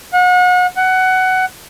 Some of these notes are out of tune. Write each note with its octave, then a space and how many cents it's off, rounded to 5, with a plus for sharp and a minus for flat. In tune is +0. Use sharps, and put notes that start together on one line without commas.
F#5 -35
F#5 +15